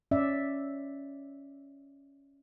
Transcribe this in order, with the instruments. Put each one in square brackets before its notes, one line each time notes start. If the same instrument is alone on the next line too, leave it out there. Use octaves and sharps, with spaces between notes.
[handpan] C#4 D5 E5